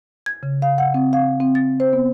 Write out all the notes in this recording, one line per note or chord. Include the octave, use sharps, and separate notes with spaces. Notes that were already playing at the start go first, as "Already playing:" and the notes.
G#6
C#3
F5
F#5
C4
F5
C4
A6
C5
B3